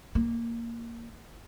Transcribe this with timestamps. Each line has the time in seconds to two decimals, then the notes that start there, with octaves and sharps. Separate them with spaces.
0.15 A#3